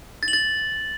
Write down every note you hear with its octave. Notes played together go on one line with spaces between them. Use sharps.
A6
F#7
A6